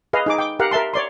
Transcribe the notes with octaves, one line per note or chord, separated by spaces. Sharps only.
G#4 B4 D#5 F5
D#4 G#4 D6
G5 D6
G4 A#4 F5 F#5
A#4 E5 A5 C6
C#5 D5 C6